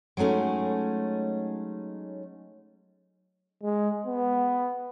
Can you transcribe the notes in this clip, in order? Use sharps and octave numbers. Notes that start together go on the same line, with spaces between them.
F#3 G#3 A3 C#4 D#4
G#3
B3